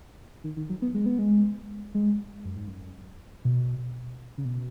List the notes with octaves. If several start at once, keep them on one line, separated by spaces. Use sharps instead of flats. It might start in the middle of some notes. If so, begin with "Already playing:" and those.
D#3
D#3
F#3
B3
G#3
B3
G#3
G#3
F#2
G#2
F#2
B2
C#3
B2